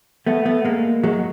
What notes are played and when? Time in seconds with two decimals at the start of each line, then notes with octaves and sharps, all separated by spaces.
0.26 A3 B3
0.45 A3 B3
0.65 G#3 A#3
1.03 F#3 G#3